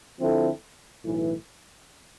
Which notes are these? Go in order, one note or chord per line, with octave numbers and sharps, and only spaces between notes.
D3 F3 C4 E4 A4
B1 A2 E3